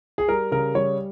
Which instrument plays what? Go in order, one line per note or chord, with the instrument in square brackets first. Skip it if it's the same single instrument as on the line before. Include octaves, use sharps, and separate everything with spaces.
[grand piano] G#4
G3 A#4
C#3 A#4
G3 C#5